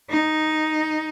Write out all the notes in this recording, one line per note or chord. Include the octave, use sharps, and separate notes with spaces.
D#4